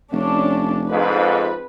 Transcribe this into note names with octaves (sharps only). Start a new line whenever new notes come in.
F1 C#4 D4
F2 G#2 B4